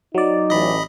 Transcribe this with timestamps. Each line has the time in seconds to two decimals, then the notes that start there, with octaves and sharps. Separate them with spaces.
0.15 F#3 D#4 D5
0.50 A1 D#5 B5